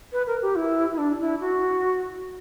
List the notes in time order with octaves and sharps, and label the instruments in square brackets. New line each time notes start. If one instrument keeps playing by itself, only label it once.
[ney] B4
A#4
G4
E4
E4
D4
E4
F#4